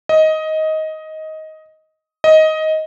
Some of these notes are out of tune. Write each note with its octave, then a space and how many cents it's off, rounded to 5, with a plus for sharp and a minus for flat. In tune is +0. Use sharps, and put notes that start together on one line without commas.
D#5 +15
D#5 +15